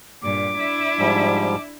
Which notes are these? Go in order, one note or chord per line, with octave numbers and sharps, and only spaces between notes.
G2 A#2 D6
D4 E4
G#2 F3 G3